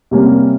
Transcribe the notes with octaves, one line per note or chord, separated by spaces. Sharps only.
C3 G3 A#3 C#4